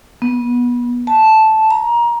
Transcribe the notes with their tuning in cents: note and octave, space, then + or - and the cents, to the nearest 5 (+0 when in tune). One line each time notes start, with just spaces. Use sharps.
B3 -25
A5 -5
A#5 +20